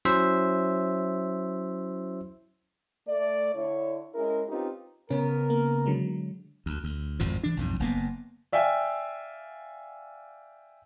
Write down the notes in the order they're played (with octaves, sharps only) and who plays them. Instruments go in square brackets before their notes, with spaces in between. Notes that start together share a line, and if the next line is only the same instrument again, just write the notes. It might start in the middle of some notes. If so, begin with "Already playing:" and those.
[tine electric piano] F#3 C#4 E4 C5 E5
[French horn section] A3 D5
D3 E4 C#5
G#3 C#4 E4 G#4 A#4
C4 C#4 D#4 F4 G4 B4
[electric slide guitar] C#3 B3 [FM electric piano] C#4 [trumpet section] A#4
[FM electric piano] A#3
D3 F#3 G#3
[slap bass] D2
D2
G#1 F2 A2 F3
E3 D4
B1 F2 G#2
F#1 A#3 B3
[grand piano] D5 E5 F5 G5 G#5